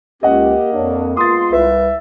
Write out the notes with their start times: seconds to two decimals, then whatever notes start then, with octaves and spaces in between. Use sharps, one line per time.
0.23 C#2 A#3 C#4 G4 D#5 F#5
0.74 F2 D4 C#5
1.17 G#3 B3 F4 C6 D#6 A6
1.52 C2 B4 E5